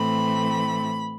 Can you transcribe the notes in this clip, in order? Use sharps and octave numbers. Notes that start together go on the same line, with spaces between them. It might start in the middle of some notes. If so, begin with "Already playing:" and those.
Already playing: A2 E3 A3 C4 B5